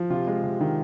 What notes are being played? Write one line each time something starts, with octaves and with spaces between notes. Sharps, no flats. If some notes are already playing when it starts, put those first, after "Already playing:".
Already playing: F3
C3 F4
G#3
C3
D#3